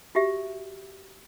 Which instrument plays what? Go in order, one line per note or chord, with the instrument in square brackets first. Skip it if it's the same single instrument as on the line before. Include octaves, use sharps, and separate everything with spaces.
[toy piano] F#4 G4 E5